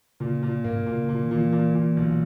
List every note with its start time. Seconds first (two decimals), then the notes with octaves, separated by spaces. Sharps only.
0.20 A#2 C#3
0.43 A#2
0.64 G#2 A#3
0.79 B2
0.86 A#2
0.94 C#3
1.08 A#2 C#3
1.23 D#3
1.31 A#2
1.38 E3
1.52 A#2
1.74 A#2
1.97 B1